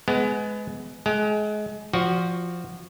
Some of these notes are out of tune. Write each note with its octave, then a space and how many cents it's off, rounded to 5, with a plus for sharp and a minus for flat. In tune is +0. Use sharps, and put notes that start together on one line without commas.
G#3 +20 B3 +20
G#3 +30 G5 +5
F3 +0 F#4 +0 D5 -25